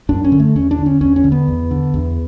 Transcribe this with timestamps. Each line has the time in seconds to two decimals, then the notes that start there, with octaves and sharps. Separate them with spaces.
0.09 F#2 D4
0.24 C#4
0.32 D3
0.40 A3
0.55 E2 C#4
0.71 D4
0.78 D3
0.86 C#4
1.01 E2 C#4
1.16 C#4
1.24 D3
1.32 B3
1.48 E2
1.71 D3
1.94 E2